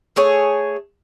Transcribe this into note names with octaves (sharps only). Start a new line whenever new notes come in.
A3 G#4 C#5